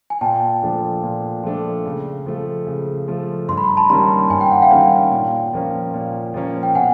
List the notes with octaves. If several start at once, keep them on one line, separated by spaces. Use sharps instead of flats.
G#5
A#2 G5 A5
F3 A3 D4
A#2
F3 A3 D4
C#3
F3 A3
C#3
F3 A3
G2 C6
B5
A#5
A5 B5
D#3 G3 A#3 C#4 A#5 C6
G2 G#5
G5
F#5
F5 G5
D#3 G3 A#3 C#4
A#2
F3 A#3 C#4
A#2
F3 A#3 C#4
G5
B2 F#5 G#5